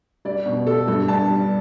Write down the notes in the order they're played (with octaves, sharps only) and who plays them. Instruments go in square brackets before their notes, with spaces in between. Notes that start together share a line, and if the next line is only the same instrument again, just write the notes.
[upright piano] G3 D5
B2
G3 A4
G2 A4
G2 A5
G3